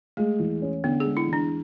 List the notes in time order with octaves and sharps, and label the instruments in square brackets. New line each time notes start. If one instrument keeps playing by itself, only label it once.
[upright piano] G#3 [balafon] A3
[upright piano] E2
C#4
[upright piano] D3 [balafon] B3
[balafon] G#4
[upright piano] G#3
[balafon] E4
[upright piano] E2
[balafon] D4